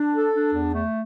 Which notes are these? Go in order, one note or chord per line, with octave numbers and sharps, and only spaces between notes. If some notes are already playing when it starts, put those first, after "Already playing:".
Already playing: D4
A4
D4
E2
A3